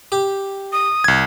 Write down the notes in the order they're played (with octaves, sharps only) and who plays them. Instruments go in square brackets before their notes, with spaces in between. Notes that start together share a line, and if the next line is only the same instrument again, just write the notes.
[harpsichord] G4
[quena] D#6
[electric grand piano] C2 G#6